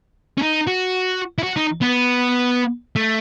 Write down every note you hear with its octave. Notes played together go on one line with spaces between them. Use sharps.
C#4
D#4
F#4
E4
F#4
D#4
B3
A3